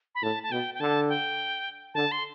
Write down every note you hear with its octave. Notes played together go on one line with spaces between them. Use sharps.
B5
A2 A5
A5
B2 G5
G5
D3 A5
G5
D3 A5
C6